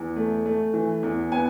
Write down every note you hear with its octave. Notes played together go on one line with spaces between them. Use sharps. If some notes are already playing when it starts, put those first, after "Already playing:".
Already playing: E2
A3
A3
E3
E2
B3 G#5